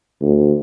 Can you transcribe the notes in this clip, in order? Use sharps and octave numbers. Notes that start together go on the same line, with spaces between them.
D2